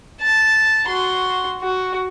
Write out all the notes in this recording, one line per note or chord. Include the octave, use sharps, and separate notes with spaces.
A5
F#4 C6
F#4